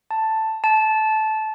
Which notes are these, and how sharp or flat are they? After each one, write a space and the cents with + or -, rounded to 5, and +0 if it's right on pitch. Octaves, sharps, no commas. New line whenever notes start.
A5 +5
A5 -15